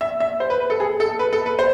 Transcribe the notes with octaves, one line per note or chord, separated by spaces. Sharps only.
E5
E5
C5
B4
B4
A4
G#4
A4
B4
A4
B4
C5